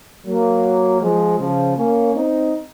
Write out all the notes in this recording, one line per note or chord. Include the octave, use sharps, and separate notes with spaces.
F#3 A#3
F3 G#3
C#3 F3
A#3 C#4
C4 D#4